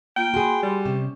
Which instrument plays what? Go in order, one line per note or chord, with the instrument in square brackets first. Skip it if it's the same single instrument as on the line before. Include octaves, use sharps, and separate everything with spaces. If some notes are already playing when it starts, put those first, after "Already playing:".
[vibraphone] A#3 F4 [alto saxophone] G5
[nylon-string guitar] F#4 G#4 [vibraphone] B5 C6
[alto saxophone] G3
[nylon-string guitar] C3 [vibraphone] C#4